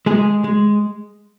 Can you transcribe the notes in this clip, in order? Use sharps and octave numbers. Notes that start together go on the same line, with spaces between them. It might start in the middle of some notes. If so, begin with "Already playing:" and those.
G#3 G#4
G#3